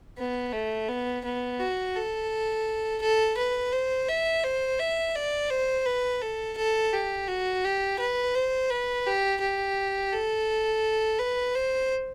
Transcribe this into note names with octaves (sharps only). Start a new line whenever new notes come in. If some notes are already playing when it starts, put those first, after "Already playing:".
B3
A3
B3
B3
F#4
A4
A4
B4
C5
E5
C5
E5
D5
C5
B4
A4
A4
G4
F#4
G4
B4
C5
B4
G4
G4
A4
B4
C5